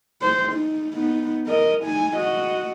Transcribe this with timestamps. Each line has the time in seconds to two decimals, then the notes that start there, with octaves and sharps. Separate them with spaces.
0.22 C5
0.52 D#4
0.94 B3 D#4
1.47 A#4 D#5
1.84 D#4 G#5
2.16 F#4 D#5